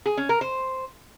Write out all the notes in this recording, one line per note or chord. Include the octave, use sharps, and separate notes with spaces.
G#4
C#4
A#4
C5